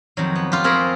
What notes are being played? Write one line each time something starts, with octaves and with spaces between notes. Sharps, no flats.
F2 D#3 F#3
B3
F4 G4
C4 G#4 A#4 C#5 B5